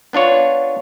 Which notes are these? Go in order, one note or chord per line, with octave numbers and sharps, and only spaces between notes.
B3 D4 F4 C#5